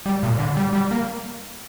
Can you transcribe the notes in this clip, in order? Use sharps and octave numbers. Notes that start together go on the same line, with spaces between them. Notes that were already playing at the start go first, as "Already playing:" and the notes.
G3
A#2
D3
G3
G3
A#3